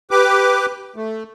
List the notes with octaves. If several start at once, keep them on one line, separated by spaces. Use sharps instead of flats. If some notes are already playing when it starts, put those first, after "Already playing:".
G4 B4 D6
A3